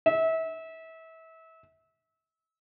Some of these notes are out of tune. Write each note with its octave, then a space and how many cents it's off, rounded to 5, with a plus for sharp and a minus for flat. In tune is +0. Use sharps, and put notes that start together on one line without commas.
E5 -30